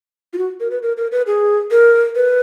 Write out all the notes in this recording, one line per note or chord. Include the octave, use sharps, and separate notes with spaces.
F4
F#4
A#4
B4
A#4
A#4
B4
G#4
A#4
B4